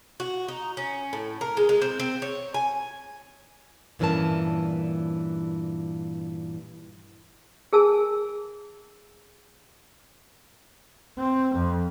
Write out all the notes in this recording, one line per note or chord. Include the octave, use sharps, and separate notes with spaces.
F#4
D#4
C#4
A2
A#4
G#3
G#3
C4
C4
C#5
G#5
G2 A#2 E3 C#4 A#4 A5
G#4 A#4 G#5 A5 E6
C4
F2